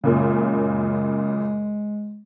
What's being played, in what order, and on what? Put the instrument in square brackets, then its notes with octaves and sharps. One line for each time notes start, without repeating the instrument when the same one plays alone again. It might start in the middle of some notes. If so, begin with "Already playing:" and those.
[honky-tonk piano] F#2 A#2 C#3 [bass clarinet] G#3